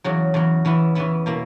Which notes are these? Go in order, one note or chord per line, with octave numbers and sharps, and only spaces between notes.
E2 C#3 F#3
E2 C#3 F#3
C#3 E3 B3 E4
C#3 E3 B3 E4
B2 A#3 E4